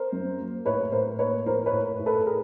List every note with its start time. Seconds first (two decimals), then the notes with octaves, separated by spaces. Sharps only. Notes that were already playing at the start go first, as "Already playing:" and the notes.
Already playing: A#4 C5
0.12 F#2
0.40 A#3
0.66 A2 B4 C#5
0.92 A2 A#4 C5
1.19 A#3 B4 C#5
1.46 F3 A#4 C5
1.66 B4 C#5
1.72 A2
1.99 A2
2.06 A4 B4
2.26 G#4 A#4